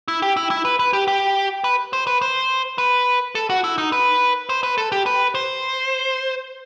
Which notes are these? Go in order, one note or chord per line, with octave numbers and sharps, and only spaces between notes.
E4
G4
E4
E4
B4
B4
G4
G4
B4
C5
B4
C5
B4
A4
F#4
E4
D#4
B4
C5
B4
A4
G4
B4
C5